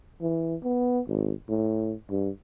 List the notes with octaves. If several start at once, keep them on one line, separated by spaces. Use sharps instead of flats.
E3
B3
G#1
A2
G2